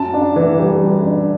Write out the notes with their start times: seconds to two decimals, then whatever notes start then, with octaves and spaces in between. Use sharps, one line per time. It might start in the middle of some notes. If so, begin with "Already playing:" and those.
Already playing: F#2 A5
0.14 D4
0.36 E3
0.59 G3
0.83 F#2
1.06 D4